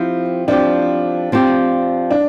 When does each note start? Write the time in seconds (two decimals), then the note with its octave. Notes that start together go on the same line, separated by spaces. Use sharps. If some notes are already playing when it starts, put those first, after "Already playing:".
Already playing: F3 C4 E4 G4
0.48 F3 C4 D4 G4
1.32 F3 C4 G4
2.11 D4